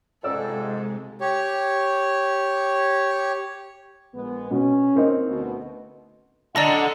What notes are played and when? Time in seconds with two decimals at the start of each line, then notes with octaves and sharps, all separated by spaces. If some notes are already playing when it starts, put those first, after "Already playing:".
0.24 F2 G#2 C3 G#3 A4 D5 E6
1.21 G4 C#5
4.14 A#1 G#3 B3
4.51 B2 C#4
4.96 A#3 C4 D#4
5.28 D2 B2
6.56 D3 A4 D5 D#5 F#5 A#5 A#6